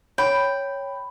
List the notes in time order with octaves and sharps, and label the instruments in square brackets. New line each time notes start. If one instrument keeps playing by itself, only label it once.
[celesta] C#5 [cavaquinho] G5 [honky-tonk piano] B5